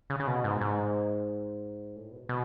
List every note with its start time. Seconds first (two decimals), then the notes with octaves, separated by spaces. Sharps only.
0.10 C#3
0.20 C#3
0.27 B2
0.44 G#2
0.61 G#2
1.96 A2
2.12 B2
2.29 B2